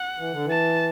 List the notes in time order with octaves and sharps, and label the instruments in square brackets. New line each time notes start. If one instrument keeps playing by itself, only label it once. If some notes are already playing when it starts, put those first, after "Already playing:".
Already playing: [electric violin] F#5
[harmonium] E3
D3
E3
[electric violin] A5